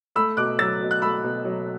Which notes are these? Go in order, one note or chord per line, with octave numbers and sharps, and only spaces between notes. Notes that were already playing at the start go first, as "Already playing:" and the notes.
A3 B5 E6
B2 D6 F#6
F#3 E6 A6
B2
F#6
A3 B5 E6
B2
F#3